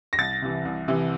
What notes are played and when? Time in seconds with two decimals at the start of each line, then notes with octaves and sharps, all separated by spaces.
0.13 A#6
0.18 C2 A6
0.42 C3 E3
0.65 C2
0.88 C3 E3